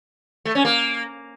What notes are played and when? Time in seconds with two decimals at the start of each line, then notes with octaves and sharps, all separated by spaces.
0.45 A3
0.55 C#4
0.65 A#3